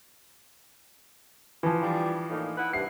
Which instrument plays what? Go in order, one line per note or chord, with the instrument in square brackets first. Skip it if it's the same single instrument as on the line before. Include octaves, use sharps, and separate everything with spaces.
[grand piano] E3 F3
[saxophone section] G3 D4 F4
A2 A#3 D#4
E4 B4 F#5
[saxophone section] G2 C3 E4 [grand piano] C7